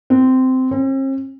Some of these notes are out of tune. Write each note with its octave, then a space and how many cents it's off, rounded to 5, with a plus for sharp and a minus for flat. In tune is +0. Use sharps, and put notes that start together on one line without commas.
C4 -15
C4 +45